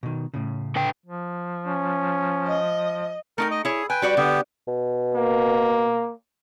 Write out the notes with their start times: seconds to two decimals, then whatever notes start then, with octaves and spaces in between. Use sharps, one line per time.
0.03 B2 D#3
0.34 A2 C#3
0.76 D3 B4 G5
1.06 F3
1.67 C#4
2.46 D#5
3.38 A3 D#4 A#4 G5
3.51 D#5
3.65 E4 G#4 C#5
3.90 B4 G5 G#5
4.02 G3 F#4 D5
4.17 D3 B3 G4
4.67 B2
5.14 A#3